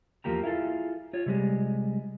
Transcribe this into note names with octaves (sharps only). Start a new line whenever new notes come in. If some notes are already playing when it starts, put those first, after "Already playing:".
E2 F3 A#3 G4 A#5
E4 F4 G#4 A4
F4 C#5
C3 G3 G#3